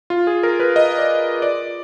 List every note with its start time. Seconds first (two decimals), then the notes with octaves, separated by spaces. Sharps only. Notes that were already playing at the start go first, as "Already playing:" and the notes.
0.10 F4
0.27 G#4
0.43 A#4
0.60 B4
0.76 D#5
0.98 D5
1.42 D5